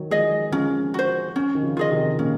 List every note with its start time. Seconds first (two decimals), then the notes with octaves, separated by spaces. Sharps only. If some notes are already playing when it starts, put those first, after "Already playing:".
Already playing: D#3 F#3
0.10 F3 G#3 G#4 D#5
0.52 F3 G#3 C#4
0.94 F#4 C5
1.36 C#4
1.55 D#3
1.63 C#3 F3
1.77 F4 G#4 D#5
1.91 C3 D#3
2.18 A#2 C#3 C#4